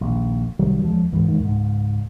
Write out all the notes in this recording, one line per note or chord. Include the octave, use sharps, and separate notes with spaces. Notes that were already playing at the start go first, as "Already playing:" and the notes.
A#1 D#2
C2 D#3 F#3 G3
D#2 F3 G#3
C#2 G#2 E3
D1 E2 D#3 G#3
C#2 G#2